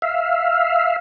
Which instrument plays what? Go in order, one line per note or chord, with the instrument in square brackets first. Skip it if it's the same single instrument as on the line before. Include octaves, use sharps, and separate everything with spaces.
[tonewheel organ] E5 F5